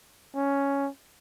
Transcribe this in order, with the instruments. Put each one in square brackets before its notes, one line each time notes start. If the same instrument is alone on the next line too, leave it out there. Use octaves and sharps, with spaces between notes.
[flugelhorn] C#4